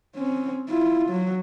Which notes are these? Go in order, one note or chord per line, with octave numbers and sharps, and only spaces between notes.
C4 C#4
E4 F4
F#3